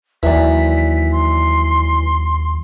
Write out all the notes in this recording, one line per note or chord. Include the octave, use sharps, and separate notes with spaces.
D#2 E3 F#3 D5 B6
C6